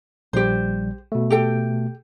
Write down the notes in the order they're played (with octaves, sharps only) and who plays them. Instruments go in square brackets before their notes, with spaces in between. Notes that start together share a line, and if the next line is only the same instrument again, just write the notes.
[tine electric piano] A#1 G3 [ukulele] G4 C5
[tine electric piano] B2 A3
[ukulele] G4 A4 G5